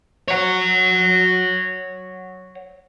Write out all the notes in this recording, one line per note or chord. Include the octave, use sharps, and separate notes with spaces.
C#5 F#5